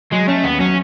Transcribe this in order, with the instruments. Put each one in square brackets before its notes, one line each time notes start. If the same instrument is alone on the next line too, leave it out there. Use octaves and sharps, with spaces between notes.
[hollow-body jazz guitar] F#3 [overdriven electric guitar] G#3
[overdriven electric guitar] A3 [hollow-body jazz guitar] C#4
[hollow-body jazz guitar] D#2 [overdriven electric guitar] B3
[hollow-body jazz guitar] F#3 [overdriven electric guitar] C#4